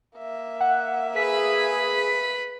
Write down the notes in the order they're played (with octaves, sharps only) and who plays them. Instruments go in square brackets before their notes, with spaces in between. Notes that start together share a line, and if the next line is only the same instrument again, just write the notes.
[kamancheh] A#3 E5
[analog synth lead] F#5
[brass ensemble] G#4 [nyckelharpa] B4 B5 [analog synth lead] B6